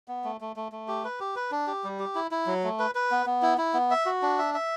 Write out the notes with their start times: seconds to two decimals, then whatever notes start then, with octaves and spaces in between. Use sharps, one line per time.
0.08 B3
0.24 A3
0.41 A3
0.56 A3
0.72 A3
0.88 G4
1.04 B4
1.20 G4
1.36 B4
1.51 D4
1.67 G4
1.84 G3
1.99 G4
2.15 E4
2.31 E4
2.47 F#3
2.64 A3
2.79 B4
2.95 B4
3.11 B3
3.26 B3
3.42 E4
3.58 E4
3.74 B3
3.91 E5
4.06 F#4
4.22 D4
4.38 E5
4.54 E5